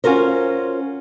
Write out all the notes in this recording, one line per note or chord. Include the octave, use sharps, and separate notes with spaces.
C#4 F4 F#4 A#4 C5